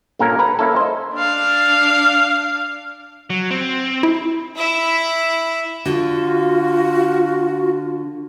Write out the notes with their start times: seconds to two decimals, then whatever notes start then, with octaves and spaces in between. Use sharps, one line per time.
0.19 G2 A#2 A#3 C#4 A4 A#4
0.39 B4 A#5
0.59 A#3 C#4 E4 A4
0.76 C5 D#5
1.14 D4 F5
3.30 F#3
3.51 C4
4.03 E4
4.56 E4 E5
5.85 D3 F4 F#4